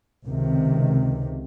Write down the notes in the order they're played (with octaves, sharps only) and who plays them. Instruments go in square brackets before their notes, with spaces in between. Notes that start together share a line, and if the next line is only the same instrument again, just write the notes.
[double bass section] C#2 C3 D#3